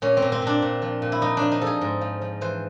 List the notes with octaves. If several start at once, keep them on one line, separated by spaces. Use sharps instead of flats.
A#2 C#4
C4
A#2
C4
A#2 D4
A#2
F3
A#2
E4
F3 D#4
F3 D4
D#4
F3 G#4 A4
G#2
F3
F3
E3 C5